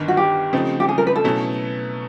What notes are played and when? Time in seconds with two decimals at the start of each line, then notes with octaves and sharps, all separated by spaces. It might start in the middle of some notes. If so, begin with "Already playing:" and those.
Already playing: G1 G2 D#3
0.08 F#4
0.17 G4
0.53 C#3 F3 A3 C4 D#4
0.80 G4
0.89 G#4
0.98 A#4
1.07 B4
1.16 A4
1.24 B2 F#3 A3 C#4 E4